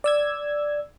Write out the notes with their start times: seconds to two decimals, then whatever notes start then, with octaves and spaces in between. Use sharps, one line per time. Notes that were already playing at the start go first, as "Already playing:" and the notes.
0.04 D5 E6 G#6